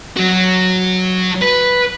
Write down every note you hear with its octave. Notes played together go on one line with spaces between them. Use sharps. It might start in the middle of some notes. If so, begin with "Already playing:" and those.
F#3 F#4
B4